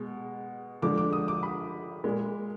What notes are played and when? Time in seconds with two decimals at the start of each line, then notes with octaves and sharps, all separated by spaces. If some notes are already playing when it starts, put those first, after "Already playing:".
Already playing: B2 G#3
0.82 D3 F3 G#3 D6
0.98 D6
1.13 D#6
1.28 D6
1.43 B5
2.04 A#2 G#3